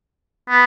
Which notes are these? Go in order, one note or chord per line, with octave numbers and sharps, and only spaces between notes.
B3